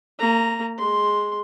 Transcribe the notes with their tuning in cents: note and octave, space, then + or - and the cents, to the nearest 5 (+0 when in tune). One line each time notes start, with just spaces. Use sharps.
A#3 -35 A#5 +0
G#3 +0 C6 +0